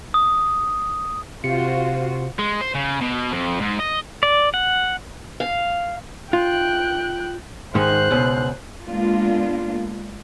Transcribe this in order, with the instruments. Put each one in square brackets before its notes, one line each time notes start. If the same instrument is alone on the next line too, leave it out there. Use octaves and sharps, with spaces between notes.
[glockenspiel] D#6
[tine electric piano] C3 C#7 [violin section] F4 F#4 C5
[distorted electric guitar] G#3
C5
C#3
B2
F2
G#2
D#5
[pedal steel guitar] D5
F#5
[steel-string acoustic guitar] F5
[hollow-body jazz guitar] F4 [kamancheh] G5 F#6
[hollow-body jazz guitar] G#2 D#3 G#3 [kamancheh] C5 F#6
[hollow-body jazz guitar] C#2 B2
[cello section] G#3 A#3 B3 D4 F4